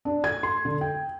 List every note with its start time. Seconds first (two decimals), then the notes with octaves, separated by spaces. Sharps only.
0.05 D4
0.24 G#6
0.43 C6
0.65 D3
0.81 G5